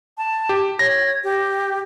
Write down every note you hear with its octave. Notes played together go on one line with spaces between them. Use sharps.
A5
G4
C#5 A#6
G4